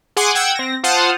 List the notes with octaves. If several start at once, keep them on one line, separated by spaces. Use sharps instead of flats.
G#4 F#5 G#5 C6 D6
F#5 G5 E6 G#6
C4 A#6
F4 C5 F#5 A5 D#6 F6